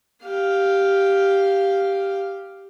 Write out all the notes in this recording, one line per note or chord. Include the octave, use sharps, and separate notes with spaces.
G4 F5